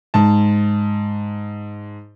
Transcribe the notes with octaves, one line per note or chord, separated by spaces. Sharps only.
G#2 A5